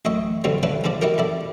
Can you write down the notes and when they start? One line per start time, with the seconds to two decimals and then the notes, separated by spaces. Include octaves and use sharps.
0.05 A1 F#2 D#5 E5 C#6
0.44 F#2 B2 D3 F3 G3 C4
0.63 F3 C#4 D4 E4 B4
0.84 C2 G#2 F3 B3 D5
1.02 D#4 E4 F#4 G4 A#4
1.18 F2 E4 D5